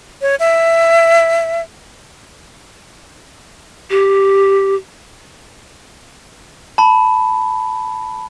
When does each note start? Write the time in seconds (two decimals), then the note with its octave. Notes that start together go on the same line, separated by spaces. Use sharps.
0.22 C#5
0.40 E5
3.90 G4
6.78 A5 B5